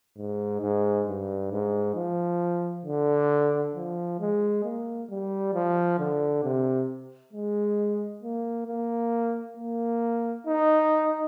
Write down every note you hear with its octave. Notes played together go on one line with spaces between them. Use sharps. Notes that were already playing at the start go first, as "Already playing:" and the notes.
G#2
G#2
G2
G#2
F3
D3
F3
G#3
A#3
G3
F3
D3
C3
G#3
A#3
A#3
A#3
D#4